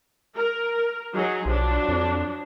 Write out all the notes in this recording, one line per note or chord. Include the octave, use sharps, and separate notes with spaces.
A#4
F#3 D#4 G#4
B1 F3 F#3 D4
F2